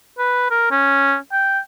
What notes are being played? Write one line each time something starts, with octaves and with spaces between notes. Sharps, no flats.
B4
A#4
C#4
G5